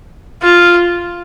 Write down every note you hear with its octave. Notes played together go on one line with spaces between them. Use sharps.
F4